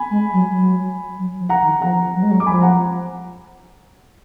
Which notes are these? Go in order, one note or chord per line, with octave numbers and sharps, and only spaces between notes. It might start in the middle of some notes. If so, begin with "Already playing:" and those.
Already playing: G#5 B5
G#3
F#3
F#3
F#3
F3
F#5 A#5
D#3
F3 F#5 A#5
F#3
G#3
F#3
D6
F3 G#5 B5
F#5 A#5